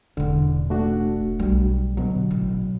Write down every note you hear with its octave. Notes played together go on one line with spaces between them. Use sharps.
E1 A1 D3
A3 D4 F#4
B1 G3
B2 D3 F#3
A1